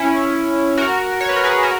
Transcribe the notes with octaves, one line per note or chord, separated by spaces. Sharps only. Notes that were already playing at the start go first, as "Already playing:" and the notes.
Already playing: C#4 E4
F#4 A#4
C#5
B4
A#4
G#4 B4
F#4 A#4